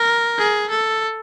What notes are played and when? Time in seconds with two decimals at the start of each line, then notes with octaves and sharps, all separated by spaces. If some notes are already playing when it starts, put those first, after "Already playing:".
Already playing: A#4
0.38 G#4
0.70 A4